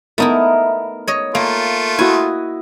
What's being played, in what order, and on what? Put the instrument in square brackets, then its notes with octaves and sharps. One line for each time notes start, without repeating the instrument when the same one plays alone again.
[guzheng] A3 D#4 E4 [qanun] B3 A#4
[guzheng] C#5 D#5
[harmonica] A3 F4 [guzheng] A#3
[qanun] E4 F#4 D#5 [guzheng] G#5